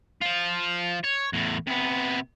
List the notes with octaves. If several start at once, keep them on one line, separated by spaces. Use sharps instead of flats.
F3 F4
C#5
E2 A2
C3 B3